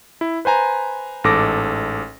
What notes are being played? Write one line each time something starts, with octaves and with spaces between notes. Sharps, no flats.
E4
B4 C5 G#5 A#5
A1 G#2 A4 D6 A#6